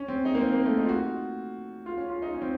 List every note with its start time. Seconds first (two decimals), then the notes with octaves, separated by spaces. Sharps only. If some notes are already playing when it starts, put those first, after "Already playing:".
Already playing: C#4
0.08 C4
0.25 D#4
0.35 A#3
0.41 C4
0.53 A#3
0.65 A3
0.78 D#4
0.84 F4
0.89 F#4
1.86 F4
1.97 C#4
2.10 F4
2.22 D#4
2.35 C#4
2.42 C4